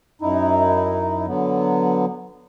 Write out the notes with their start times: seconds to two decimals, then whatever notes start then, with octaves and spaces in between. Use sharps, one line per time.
0.21 F#2 D#4 E4
1.27 D3 F#3 B3